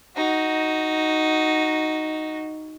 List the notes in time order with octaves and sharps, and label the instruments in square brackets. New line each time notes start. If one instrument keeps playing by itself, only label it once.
[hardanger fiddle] D#4 F#4